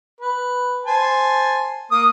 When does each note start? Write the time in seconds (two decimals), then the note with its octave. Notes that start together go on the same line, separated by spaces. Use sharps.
0.21 B4
0.86 C5 G#5 A5
1.92 A#3 D#6